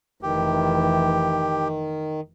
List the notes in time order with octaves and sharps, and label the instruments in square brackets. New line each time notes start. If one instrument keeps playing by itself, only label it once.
[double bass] F1 E3 [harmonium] D#3 [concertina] G4